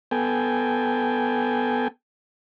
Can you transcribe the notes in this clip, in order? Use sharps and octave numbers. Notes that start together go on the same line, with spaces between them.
B3 A4 G5 G#5